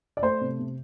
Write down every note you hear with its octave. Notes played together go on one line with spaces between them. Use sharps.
D5
A3 C5
C3
C3